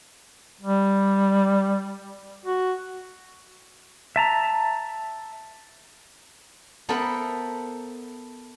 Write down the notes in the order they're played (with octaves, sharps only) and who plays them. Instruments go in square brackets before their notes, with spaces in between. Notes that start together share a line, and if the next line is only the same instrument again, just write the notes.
[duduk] G3
F#4
[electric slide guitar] E5 A5 A#5
[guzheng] B3 A4 A#4 C5 E5 B5